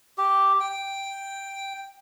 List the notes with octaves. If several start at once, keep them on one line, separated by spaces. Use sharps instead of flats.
G4
G5